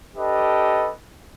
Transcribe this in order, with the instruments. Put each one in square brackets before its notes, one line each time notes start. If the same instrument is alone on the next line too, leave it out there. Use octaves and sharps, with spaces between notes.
[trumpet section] D4 G4 A4 B4 D#5